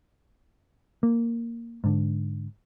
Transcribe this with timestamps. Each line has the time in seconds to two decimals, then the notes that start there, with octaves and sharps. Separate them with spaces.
1.03 A#3
1.84 G#2 D3